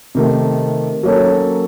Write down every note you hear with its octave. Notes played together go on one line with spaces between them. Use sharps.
C3 D#3 A3
F#3 A#3 C#4 A4